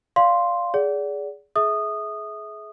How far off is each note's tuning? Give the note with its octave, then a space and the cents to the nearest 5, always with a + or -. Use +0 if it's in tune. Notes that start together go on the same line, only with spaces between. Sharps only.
D5 +0 F5 +0 C6 +0
G#4 +0 D5 -30 F#5 +10
G#4 +30 E5 -20 D#6 -15